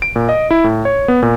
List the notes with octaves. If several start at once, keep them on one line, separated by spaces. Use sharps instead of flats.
D7
A#2
D#5
E4
A2
C#5
B3
A#2